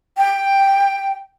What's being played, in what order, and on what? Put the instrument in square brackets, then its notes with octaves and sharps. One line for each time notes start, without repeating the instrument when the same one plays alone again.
[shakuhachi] G5